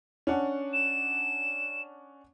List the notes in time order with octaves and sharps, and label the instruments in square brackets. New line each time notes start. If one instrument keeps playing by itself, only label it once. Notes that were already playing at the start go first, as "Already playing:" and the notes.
[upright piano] C#4 D4 F#5
[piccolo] E7